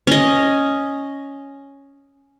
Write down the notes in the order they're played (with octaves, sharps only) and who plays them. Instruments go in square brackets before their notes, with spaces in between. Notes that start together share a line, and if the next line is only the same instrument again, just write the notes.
[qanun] C#4 D#5